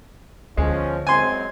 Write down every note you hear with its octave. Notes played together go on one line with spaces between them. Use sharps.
D2 F3 G#3 B3 C#4
F#2 G#3 C4 G#5 C6